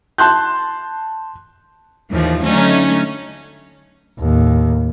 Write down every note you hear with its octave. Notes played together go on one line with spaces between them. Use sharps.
A5 C6 F#6 G6
D#2 A2 E3 F3
D3 F#3 A3 C#4 D#4
D#2 A2